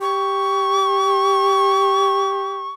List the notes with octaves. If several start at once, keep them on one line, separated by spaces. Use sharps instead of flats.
G4 C#6